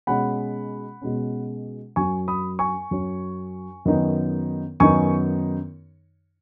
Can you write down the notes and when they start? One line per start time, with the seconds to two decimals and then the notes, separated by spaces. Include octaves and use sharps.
0.07 B2 G#3 C#4 F#5 B5
1.02 B2 G#3 C#4
1.96 F#2 F#3 C#4 G#5 C#6
2.28 B5 D#6
2.59 G#5 C#6
2.91 F#2 F#3 C#4
3.85 F#2 D#3 B3 D#4
4.80 F#2 D#3 B3 D#4 G#5 C#6